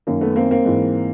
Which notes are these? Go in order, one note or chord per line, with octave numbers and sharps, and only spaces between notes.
F#2 D#3 A#3
A3 B3
A#3 C4
A#3 C4
G#2 E3